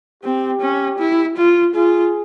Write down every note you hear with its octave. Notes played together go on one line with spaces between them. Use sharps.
C4 G4
C#4
E4
F4
F4 G#4